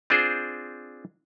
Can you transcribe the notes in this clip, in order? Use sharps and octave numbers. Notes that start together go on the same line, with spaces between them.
C4 D4 F4 G#4 C5